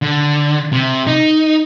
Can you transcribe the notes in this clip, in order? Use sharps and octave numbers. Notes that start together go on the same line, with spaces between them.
D3
C3
D#4